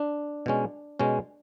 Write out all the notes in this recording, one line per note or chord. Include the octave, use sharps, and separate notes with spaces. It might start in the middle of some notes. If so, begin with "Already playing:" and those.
Already playing: D4
B2 G#3 C#4
B2 G#3 C#4